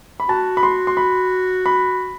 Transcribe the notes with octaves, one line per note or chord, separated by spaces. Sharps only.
B5
F#4 A5
B5
C6
C6
B5
B5